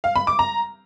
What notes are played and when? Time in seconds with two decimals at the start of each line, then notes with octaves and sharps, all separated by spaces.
0.04 F5
0.16 B5
0.27 D6
0.39 A#5